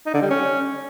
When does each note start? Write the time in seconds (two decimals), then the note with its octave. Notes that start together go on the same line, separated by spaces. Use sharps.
0.06 D#4
0.14 D3
0.22 G3
0.30 C#4